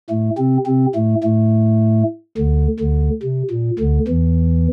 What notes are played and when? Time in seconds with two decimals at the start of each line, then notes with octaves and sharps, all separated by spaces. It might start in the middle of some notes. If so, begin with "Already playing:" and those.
0.10 A2 A3
0.38 C3 C4
0.66 C3 C4
0.95 A2 A3
1.23 A2 A3
2.38 D2 D3
2.79 D2 D3
3.23 C3
3.50 A#2
3.79 D2 D3
4.07 E2 E3